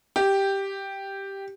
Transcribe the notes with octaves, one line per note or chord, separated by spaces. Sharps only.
G4